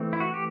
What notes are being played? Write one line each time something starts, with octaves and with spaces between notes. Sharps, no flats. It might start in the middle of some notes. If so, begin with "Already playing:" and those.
Already playing: E3 A3 C4
E4
F#4
G4